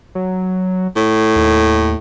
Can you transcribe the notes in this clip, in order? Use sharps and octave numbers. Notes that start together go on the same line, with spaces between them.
F#3
A2
D#2